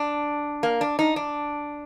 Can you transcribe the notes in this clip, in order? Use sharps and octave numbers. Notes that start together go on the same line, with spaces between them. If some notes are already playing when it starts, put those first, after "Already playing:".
Already playing: D4
A#3
D4
D#4
D4